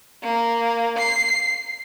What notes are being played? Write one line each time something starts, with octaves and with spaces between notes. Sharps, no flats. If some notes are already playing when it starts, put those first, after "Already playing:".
A#3
C7